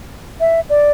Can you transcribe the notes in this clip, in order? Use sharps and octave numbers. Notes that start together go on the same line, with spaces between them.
E5
D5